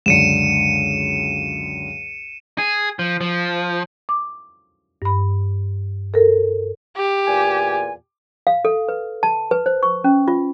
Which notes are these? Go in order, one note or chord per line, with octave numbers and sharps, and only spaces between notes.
C#2 F#2 D3 C#7 D#7 E7
G#4
F3
F3
D6
G2 B5
A4 A#4
G4
E2 A#2 G#5
F5
A4
B4
A5
B4
C5
C#6
C#4
F4